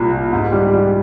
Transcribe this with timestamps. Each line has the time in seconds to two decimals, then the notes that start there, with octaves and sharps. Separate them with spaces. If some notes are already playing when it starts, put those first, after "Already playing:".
Already playing: C2 A#2
0.13 A#2
0.33 G#2
0.52 G3
0.71 G3